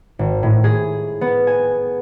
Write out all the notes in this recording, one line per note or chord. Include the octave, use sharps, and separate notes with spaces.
G#1
A2
G#4
B3
G#5